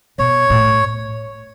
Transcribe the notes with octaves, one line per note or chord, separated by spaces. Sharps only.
B2 C#5
A2